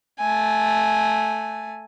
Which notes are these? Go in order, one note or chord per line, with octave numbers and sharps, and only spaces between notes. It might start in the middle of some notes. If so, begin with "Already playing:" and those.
A3 G#5